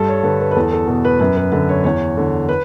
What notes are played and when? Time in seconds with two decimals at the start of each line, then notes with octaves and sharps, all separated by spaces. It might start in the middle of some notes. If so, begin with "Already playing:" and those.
Already playing: G2 A4
0.08 C#5
0.23 D3 B4
0.40 B4
0.51 B4
0.55 E2 A4
0.73 A4
0.88 B2 A4
1.05 B4
1.20 F#2 B4
1.37 B4
1.52 D3 B4
1.69 C#5
1.84 E2 C#5
2.17 D3
2.49 B4